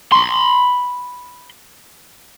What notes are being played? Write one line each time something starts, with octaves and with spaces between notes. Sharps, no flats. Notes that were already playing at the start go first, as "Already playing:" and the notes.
B5 C6